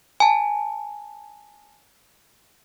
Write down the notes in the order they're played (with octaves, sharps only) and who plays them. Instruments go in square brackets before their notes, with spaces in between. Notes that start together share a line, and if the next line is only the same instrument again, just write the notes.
[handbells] G#5 A5